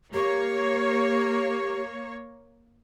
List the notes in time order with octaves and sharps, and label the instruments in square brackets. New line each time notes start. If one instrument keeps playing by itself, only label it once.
[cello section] A#3 C#5 [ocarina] G4